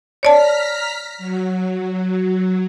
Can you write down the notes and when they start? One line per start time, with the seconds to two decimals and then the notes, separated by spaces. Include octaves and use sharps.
0.23 C#5 D5 A5 A#5 F6 B6
1.18 F#3